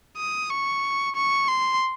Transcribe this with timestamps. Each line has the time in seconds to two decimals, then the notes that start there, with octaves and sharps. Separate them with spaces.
0.17 D#6
0.50 C#6
1.16 C#6
1.48 C6